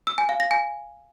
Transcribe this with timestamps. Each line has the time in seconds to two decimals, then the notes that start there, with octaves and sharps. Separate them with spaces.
0.07 E6
0.18 G#5
0.29 F5
0.40 A#6
0.51 G#5